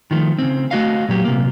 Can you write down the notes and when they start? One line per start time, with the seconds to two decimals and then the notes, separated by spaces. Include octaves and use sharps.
0.11 D#3 F3 A3
0.39 C#3 C4
0.71 A3 F#4 D#5 F5
1.09 A#2 F#3 G4
1.24 C3 A#3